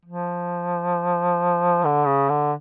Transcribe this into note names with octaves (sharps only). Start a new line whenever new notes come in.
F3
D3
C#3
D3